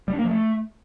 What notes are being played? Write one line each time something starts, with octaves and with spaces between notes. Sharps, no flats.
G3
D4
A#3
F3
A3